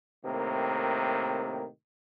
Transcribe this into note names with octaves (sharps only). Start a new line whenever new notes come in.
A2 C3 D#3 A#3